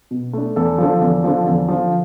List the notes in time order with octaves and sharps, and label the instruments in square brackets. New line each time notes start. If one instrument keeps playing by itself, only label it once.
[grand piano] B2
A3 D4
E2 A4
D3 F3
E2
D3 F3
E2
D3 F3